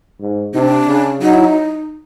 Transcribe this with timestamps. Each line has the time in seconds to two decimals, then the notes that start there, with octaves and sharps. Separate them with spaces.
0.20 G#2
0.53 C3 D4 D#4
0.88 C#3
1.22 F#3 D#4
1.34 E4
1.44 D#4